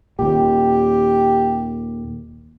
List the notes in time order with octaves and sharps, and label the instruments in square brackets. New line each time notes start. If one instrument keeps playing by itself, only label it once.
[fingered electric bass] D#2 A#2 [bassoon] G4